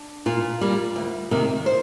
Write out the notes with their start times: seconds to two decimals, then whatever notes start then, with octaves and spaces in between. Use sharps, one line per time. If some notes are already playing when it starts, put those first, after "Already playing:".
Already playing: D4
0.26 A#2 F4
0.61 G3 A#3
0.96 D2
1.31 C3 D#3 A#3
1.66 C5